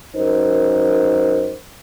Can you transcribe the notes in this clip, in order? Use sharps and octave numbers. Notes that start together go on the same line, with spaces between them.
F#2 D#4 A#4 C5